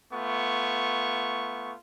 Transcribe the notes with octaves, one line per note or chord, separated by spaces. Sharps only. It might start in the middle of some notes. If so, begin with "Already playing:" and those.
A3 B3 F4 C#6